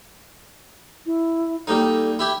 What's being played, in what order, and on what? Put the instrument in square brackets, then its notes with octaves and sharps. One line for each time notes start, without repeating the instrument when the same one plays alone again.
[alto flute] E4
[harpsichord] G3 A#3 D#4 [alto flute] A4
[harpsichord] E4 G4